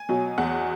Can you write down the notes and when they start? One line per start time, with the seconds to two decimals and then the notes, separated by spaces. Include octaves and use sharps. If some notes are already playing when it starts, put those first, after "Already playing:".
Already playing: G#5
0.09 B2 F#3
0.38 E2 F#5